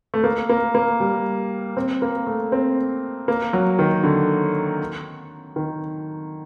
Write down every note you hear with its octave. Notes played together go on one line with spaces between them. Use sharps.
A3
A#3
A#3
A#3
G3
C4
A#3
A3
C4
A#3
F#3
D#3
D3
D#3